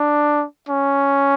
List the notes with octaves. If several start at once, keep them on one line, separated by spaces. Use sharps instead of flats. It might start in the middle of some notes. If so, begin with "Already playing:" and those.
Already playing: D4
C#4